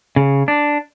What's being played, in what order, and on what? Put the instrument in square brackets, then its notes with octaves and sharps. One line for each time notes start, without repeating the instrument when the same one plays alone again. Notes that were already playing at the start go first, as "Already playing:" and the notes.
[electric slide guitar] C#3
D4